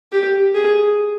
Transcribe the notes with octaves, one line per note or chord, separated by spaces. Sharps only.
G4
G#4